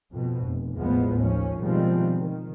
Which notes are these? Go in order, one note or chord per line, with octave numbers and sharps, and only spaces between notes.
F2 B2
F1
A1 E2 A2 F3 G#3 B3
D#2 F3 C#4
B2 D#3 F3 G3 G#3 C4
D#3